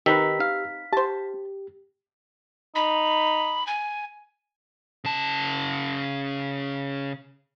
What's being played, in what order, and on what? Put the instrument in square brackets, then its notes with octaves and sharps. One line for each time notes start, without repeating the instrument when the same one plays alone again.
[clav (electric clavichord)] D#3 [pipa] C4 D#4 B4 [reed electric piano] G4 E6 [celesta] B6
[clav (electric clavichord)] F5
[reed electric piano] G4 [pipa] C5 A5
[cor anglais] D#4 [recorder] B5
[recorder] G#5
[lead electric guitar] C#3 A5